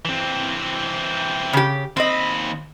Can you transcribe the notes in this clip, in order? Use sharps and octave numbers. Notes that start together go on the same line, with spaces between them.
E3 C4
C#3 G4
D#2 C4 D#5 B5